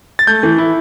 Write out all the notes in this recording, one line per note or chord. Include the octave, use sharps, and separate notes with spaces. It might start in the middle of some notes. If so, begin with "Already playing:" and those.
A6
A3 G6
E3
E4